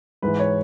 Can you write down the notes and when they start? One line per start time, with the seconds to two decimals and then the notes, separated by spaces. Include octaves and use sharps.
0.22 G#2 E3 B4
0.39 C#5